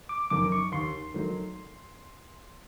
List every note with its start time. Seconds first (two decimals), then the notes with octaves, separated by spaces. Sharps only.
0.09 D6
0.30 F#2 D#3 D6
0.52 C#6
0.72 D#2 C6
1.14 D#3 F#3 A3